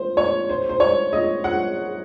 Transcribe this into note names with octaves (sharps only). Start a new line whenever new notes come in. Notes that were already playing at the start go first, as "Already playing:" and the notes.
Already playing: C5
C#5
C5
C5
C#5
D#5
F#5